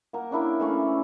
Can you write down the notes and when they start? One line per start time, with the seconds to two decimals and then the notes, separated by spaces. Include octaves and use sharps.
0.13 A#3 A#4 F#5
0.31 C#4 D4 E4 A#4
0.59 E3 A3 C#4